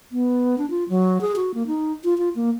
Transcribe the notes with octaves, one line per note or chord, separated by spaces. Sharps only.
B3
D4
F4
F#3
G#4
F#4
A#3
D#4
F4
F4
A#3